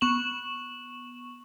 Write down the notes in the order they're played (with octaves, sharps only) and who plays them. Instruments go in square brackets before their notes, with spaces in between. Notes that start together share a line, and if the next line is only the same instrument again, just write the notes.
[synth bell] B3 C#6 E7 F#7